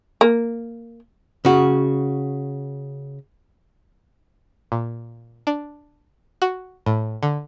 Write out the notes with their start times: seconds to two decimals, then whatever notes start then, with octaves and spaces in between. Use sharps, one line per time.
0.21 A#3
1.45 C#3 F#4
4.72 A#2
5.47 D4
6.42 F#4
6.86 A2
7.23 D3